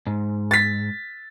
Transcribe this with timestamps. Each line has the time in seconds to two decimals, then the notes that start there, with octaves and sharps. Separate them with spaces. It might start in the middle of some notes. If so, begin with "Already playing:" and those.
0.07 G#2
0.51 A6 B6